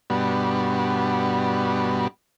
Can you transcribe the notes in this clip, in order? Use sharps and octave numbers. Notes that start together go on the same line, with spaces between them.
G2 B2 G3 B3 D4 F#4